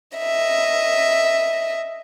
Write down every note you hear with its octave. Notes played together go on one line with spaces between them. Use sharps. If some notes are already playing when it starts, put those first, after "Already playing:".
D#5 E5